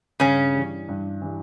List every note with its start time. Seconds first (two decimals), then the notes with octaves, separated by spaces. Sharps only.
0.20 G2 C#3 C#4
0.54 E3 G3
0.88 G2
1.22 E3 G3